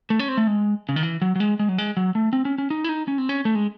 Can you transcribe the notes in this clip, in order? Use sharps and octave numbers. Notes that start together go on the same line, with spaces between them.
A3
C#4
C4
A3
G#3
C#3
D#3
E3
F#3
F#3
G#3
G#3
F#3
G#3
F#3
A3
C4
C#4
C#4
D#4
E4
D#4
C#4
C4
C#4
A3
G#3